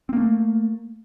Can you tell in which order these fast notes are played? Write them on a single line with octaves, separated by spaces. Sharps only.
C4 A#3 A3